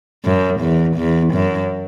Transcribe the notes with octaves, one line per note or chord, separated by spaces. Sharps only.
F#2
E2
E2
F#2